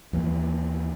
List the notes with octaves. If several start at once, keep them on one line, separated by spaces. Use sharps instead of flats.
D#2 E3 A#3